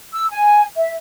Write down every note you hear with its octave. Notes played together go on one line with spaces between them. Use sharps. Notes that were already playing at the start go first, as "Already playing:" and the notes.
E6
G#5
E5